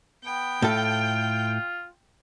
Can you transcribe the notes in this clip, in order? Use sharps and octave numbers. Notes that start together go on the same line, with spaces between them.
B3 G5
A2 F4 A4